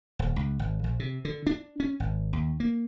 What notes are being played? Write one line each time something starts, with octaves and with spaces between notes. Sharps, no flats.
D#1
C#2
G#1
A#1
C3
D3
D4
C#4
G#1
D#2
A#3